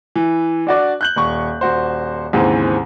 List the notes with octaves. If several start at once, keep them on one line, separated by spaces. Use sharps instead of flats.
E3
D4 F#4 D5
F#6 G6 F#7
D#1 C#6
D#1 F#4 C5
D#2 G#2 C#3 E3 C4